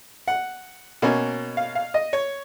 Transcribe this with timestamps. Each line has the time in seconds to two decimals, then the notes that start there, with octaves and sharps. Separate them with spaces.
0.28 F#5
1.02 B2 A#3 C#4
1.57 F5
1.75 F5
1.94 D#5
2.13 C#5